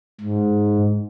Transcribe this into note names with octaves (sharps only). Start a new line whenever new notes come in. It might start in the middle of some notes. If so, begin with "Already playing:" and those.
G#2